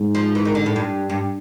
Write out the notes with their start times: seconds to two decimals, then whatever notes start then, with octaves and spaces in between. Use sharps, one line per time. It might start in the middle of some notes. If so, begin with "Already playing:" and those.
Already playing: G#2
0.15 F3
0.35 E3
0.45 D#3
0.55 D3
0.66 A2
0.76 G2
1.10 G2